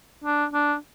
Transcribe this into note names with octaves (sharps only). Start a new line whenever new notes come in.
D4
D4